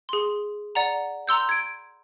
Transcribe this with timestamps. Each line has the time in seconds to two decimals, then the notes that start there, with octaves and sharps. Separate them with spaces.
0.09 G#4 C6
0.75 D5 F#5 A#5
1.27 A#5 C6 E6 G6
1.49 G#6 D7